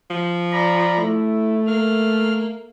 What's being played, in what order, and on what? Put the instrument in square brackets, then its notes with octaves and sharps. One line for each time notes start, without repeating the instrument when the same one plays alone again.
[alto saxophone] F3
[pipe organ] D5 A#5 B5
[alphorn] A3 [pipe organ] E4
[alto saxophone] A#3 [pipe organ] F6